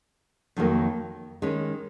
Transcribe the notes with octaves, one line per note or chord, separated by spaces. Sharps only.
F2 D#3 F#3 A#3
D#3 G#3 C#4